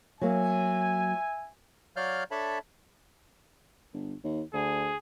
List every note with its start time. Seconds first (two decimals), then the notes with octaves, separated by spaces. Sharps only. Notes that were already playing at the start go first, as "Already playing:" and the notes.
0.21 F#3 A#3 E5 G#5
1.96 F#3 C#5 D5 F5 F6 G6
2.31 D4 A4 C#5 E5 A5 B5
3.93 G1
4.24 D#2
4.53 D2 G#4